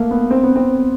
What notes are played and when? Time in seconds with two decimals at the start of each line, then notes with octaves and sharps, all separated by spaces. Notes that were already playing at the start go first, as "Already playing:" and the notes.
Already playing: A3 A#3
0.11 B3
0.31 C4
0.43 B3
0.56 C4